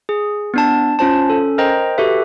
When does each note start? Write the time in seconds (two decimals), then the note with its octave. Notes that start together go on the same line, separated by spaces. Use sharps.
0.09 G#4
0.54 B3 D4 A5
0.99 C#4 F4 C5 A5
1.30 C#4 A4
1.58 A#4 C5 D#5 G5 A#5
1.98 F#4 G4 A4 B4 E5